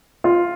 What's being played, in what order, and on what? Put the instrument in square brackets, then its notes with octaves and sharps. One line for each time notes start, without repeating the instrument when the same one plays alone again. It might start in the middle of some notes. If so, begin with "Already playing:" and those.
[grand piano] F4